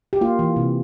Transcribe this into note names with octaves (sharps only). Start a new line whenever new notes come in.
G4
A#3 F4
E3
C3